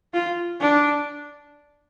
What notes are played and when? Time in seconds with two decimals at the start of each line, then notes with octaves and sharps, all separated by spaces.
0.14 F4
0.61 D4